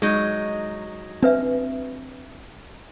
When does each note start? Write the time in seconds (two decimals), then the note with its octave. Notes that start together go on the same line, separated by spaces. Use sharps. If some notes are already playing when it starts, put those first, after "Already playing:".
0.02 F#3 G#3 D#4
1.22 C4 D4 B4 E5